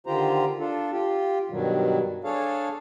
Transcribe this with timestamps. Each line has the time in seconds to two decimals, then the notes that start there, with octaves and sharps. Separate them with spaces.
0.07 D3 D#3 F4 G4 C5 A#5
0.59 D4 F4 A4
0.92 F4 G4
1.50 G2 B2 D#3 F#3 G3
2.24 D4 G#4 A4 C#5 F5 A5